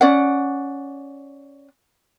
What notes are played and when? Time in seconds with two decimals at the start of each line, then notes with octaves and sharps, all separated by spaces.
0.01 C#4 D5 F#5